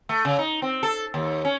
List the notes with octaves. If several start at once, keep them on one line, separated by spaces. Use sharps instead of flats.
A3
C#3
D#4
C4
A4
D#2
C#4